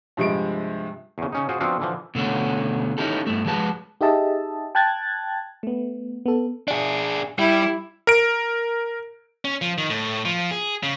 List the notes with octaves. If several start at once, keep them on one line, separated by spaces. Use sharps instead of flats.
G2 C3 F3 G#3 D7
E2 C#3
C#3 C#4 D#4
F4 F#4 G#4 C5
F3 B3 C4 D4 F#4 F5
D3 E3 F3
B2 D3 A3 C#4 F#4
C#4 D#4 E4 G4 A4
G2 A3
F3 G#3 F#4 B4 A5
D#4 G4 G#4 D#5 E5 A5
G5 A5 F#6 G#6 A6
A3 B3
B3 A4
D4 G#4
G3 E4
A#4 D7
C#4
F3
D#3
A2
F3
G#4
C#3